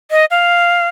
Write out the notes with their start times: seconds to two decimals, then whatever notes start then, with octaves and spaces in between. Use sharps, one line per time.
0.11 D#5
0.31 F5